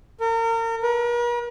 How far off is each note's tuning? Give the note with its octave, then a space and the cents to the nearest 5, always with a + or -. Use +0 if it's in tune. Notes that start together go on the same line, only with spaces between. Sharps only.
A#4 -35
A#4 +45